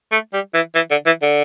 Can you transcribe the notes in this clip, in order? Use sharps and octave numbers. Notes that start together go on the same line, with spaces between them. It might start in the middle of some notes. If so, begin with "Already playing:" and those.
A3
G3
E3
E3
D3
E3
D3